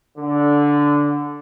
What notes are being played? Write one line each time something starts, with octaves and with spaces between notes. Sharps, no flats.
D3